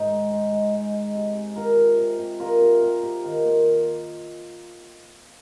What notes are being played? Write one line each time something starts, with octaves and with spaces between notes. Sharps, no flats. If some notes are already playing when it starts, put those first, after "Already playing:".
Already playing: G#2 D#4
G#3
G#2
G#3
G#3
G#3
C3
C3
C3 F4 A#4
C3
C3
C3
C3 F4 A#4
C3
C3
C3
D#3
A#3